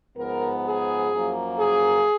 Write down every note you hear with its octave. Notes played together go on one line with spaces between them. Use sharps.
G#2 F3 B3 A#4
G#4
F#2 F3 A#3
G#4